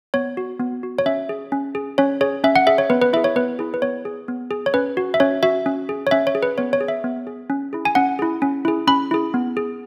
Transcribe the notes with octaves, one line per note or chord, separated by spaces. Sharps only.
B3 C#5
F#4
B3
F#4
C#5
C#4 E5
G#4
C#4
G#4
C#4 C#5
G#4 C#5
C#4 E5
F#5
G#4 E5
C#5
B3 B4
B4
E4 G#4 E5
C#5
B3 B4
E4 G#4
B4
B3 C#5
G#4
B3
G#4
C#5
C#4 B4
F#4
E5
C#4 C#5
F#4 E5
C#4
G#4
C#5
C#4 E5
C#5
G#4
B4
B3 C#5
C#5
G#4
E5
B3
G#4
C#4
E4 G#4
G#5
C#4 F#5
E4 G#4
C#4
E4 G#4
C#4 B5
E4 G#4
B3
G#4